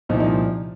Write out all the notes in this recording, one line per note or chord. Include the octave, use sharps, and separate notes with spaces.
C2 A#2 F3 D#4
D#4